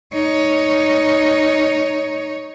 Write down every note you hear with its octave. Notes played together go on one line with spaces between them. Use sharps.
D#4 C#5